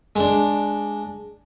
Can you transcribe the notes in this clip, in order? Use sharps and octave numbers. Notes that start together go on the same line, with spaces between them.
G#3 D4